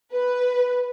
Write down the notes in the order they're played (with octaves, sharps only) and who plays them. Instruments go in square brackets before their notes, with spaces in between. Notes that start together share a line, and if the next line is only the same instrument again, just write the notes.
[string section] B4